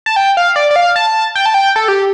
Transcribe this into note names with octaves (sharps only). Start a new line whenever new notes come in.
A5
G5
F5
D5
D5
F5
A5
G5
A5
G5
A4
G4